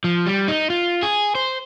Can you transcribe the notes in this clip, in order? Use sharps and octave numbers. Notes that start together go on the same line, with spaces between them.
F3
G3
D#4
F4
G#4
C5